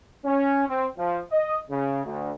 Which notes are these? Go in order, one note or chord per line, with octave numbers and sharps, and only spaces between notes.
C#4
C4
F3
D#5
C#3
D2